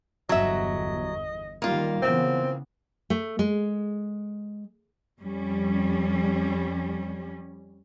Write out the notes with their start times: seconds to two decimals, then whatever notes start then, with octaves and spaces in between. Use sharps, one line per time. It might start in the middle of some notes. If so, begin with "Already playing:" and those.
0.29 G1 E2 F#3 D#5 E5
1.62 D#3 G3 A#3 F4
2.02 C#3 E3 B3 C4
3.10 A3
3.39 G#3
5.19 F2 G3 C#4